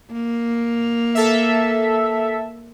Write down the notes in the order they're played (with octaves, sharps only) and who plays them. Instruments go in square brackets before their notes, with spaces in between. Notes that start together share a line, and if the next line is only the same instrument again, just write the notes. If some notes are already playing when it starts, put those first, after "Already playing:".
[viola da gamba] A#3
[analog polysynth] A4 E5